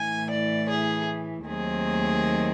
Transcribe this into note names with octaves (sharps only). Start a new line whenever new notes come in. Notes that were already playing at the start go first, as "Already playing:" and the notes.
Already playing: A2 E3 A3 G#5
D5
G#4
D#2 D#3 F#3 A3 C4 G#4